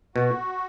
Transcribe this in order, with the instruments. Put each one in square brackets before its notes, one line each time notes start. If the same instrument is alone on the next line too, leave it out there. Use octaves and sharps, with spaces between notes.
[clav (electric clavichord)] B2 [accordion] F#4